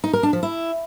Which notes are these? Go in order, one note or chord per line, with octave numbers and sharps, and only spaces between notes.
D#4
A#4
D4
F3
E4